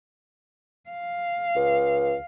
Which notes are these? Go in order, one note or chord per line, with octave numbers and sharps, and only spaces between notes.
F5
C#2